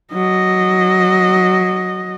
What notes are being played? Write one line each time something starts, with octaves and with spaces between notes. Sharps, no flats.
F#3 D#5